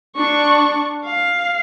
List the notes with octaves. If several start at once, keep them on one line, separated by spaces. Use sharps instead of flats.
D4 C#6
F5